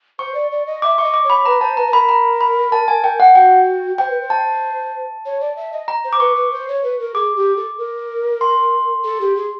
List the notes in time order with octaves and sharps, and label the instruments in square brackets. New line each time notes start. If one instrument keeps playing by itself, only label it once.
[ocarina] C5 [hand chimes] C#6
[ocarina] D5
D5
D#5
[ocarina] E5 [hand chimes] D6
[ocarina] E5 [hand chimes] C#6
[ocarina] D#5
[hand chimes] D6
[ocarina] C#5
[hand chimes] B5
[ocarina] B4 [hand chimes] A#5
[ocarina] C5 [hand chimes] A5
[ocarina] B4 [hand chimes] A#5
[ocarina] B4
[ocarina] A#4 [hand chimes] B5
[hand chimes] A#5
B5
A5
G#5
G5
F#5
[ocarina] F#4 [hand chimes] G5
[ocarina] C5 [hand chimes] G5
[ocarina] B4
C5
[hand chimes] A5
[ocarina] C#5
D5
E5
D#5
[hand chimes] A#5
[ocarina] C5
[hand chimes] D6
[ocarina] B4 [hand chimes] C#6
[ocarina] B4
C5
C#5
B4
A#4
[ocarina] G#4 [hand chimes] D6
[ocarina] G4
A4
A#4
[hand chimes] C6
[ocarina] A4
G4
G#4